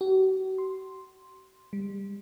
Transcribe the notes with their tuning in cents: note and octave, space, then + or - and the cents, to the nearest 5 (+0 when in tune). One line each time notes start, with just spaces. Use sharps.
F#4 +45
C6 +0
G3 +25